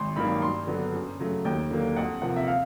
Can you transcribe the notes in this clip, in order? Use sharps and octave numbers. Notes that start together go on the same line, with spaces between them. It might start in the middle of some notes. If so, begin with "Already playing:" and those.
Already playing: G#1 C6
G2 D#3 F#3 A#3 B5
G2 C6
D3 F#3 B3
F#2
C#3 F#3 A3
D#2 G5
D3 F#3 A#3
F2 F#5
C3 F3 A#3 F#5
E5
F5